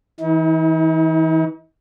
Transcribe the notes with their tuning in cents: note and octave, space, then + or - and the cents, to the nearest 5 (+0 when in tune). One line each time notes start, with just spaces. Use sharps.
E3 -25 D#4 +45